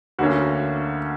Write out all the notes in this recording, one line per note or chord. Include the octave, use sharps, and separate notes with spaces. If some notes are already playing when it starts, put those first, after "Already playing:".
D2 D3 A#3 C#4 F#4